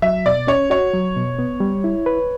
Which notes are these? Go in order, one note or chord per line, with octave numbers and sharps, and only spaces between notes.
F#3 E5
B2 D5
C#4 C#5
F#4 C#5
F#3
B2
B3
G3
E4
B4